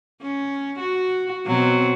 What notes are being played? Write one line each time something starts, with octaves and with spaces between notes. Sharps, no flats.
C#4
F#4
B2 F#3 C4